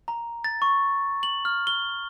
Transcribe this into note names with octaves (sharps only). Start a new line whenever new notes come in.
A#5
A6
C#6
F#7
F6
G7